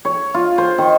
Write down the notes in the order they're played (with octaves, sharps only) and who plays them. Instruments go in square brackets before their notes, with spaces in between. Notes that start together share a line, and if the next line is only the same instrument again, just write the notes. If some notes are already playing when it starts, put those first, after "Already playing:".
[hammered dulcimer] C#5
F4
C5
D#3